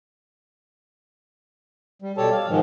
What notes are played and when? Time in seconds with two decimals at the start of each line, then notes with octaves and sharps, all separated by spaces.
2.02 G3
2.17 B2 G4 A4 C#5 D5 A5
2.32 F5
2.49 G#2 D#3 F3 G#3